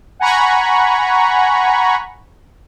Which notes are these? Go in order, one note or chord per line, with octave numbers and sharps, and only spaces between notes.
F#5 G#5 A#5 B5 C#6